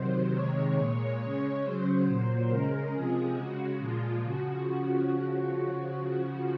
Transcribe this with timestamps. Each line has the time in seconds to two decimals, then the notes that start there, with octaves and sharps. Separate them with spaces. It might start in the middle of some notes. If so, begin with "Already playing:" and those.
Already playing: C3 D#3 F#3 C5
0.33 C3 D#3 G#3 C#5
0.77 A#2 G#3 C#5
1.19 C#3 G#3 C#5
1.63 C#3 F#3 C5
2.07 A#2 F#3
2.50 C#3 G#3 A#4
2.92 C3 F3 G#3 G#4
3.36 C#3 G#3 F#4
3.79 A#2 F3 G#3 F4
4.23 C#3 F3 F#4